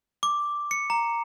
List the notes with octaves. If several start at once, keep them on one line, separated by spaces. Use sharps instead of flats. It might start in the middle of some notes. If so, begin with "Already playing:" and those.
D6
C#7
A#5